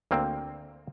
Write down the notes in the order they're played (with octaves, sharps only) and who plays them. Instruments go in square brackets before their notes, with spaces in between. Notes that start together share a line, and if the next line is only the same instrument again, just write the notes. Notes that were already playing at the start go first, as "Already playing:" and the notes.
[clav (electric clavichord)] D2 A#3 C4